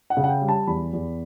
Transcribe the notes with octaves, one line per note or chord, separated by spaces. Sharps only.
F#5
C#3
F#5
G5
G3
A5
E2 B5
E2